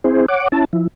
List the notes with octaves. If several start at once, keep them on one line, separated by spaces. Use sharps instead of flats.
C4 E4 G#4 C5
C#5 F#5 D6
C#4 E4 A5
F3 E4